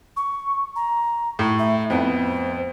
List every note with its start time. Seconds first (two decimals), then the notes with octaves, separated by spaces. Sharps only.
0.17 C#6
0.76 A#5
1.39 A2
1.59 E5
1.90 F2 B3 C5